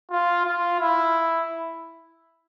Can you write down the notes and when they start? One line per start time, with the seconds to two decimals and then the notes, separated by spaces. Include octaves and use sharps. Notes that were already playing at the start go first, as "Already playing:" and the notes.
0.11 F4
0.46 F4
0.80 E4